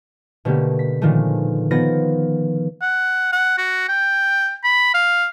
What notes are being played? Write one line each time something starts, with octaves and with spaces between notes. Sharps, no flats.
B2 D3 A3 A#3 G4
B6
A#2 D3 D#3 F3 G#3 A3
D#3 F3 B3 A#6
F#5
F#5
F#4
G5
B5
F5